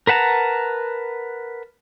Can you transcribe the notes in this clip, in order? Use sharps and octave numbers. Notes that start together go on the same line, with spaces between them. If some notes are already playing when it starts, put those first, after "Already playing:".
A#4 B4 F#5 A5 A#5